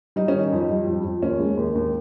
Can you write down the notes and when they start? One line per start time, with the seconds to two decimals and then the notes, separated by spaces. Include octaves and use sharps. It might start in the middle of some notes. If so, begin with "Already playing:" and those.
0.16 G3 D#4
0.28 C#4
0.34 D#3 D#4
0.52 F2
0.70 G3
0.87 F2
1.04 F2
1.22 D#2 C#4
1.39 G#3
1.57 D#2
1.75 D#2